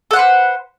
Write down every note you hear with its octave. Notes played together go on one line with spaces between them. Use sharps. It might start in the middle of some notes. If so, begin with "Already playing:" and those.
A4 B4 C5 F#5